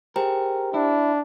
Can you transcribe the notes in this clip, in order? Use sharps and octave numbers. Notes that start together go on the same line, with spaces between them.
G4 G#4 A#4 C5 G5
D4 E4